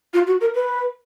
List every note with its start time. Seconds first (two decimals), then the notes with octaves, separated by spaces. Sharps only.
0.14 F4
0.27 F#4
0.41 A#4
0.55 B4